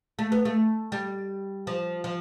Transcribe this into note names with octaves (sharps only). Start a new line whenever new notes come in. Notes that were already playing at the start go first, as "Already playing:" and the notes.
A3
B3
A3
G3
F3
F3